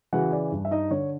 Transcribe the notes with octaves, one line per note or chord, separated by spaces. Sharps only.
C#3 E3 F#4 F#5
D5
G2
E5
D#4 D#5
D3 C#5